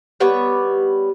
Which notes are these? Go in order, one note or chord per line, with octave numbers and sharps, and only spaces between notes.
G3 B3 B4 C#5